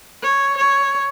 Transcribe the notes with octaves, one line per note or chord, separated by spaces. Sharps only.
C#5
C#5